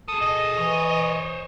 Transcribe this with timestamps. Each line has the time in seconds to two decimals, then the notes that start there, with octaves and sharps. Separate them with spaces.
0.08 G#4 A4 D#6
0.21 D#5
0.57 E3 C5 C#5